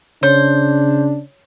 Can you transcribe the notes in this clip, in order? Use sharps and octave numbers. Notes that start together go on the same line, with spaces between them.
C#3 D4 C5 C#5